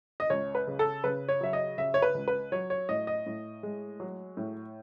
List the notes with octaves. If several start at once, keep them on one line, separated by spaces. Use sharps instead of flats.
D#5
C#2 C#5
B4
C#3
A4
C#3 B4
C#5
F#3 E5
D#5
C#3 E5
C#5
B4
C#2
B4
F#3 C#5
C#5
A2 D#5
D#5
A2
G#3
F#3
A2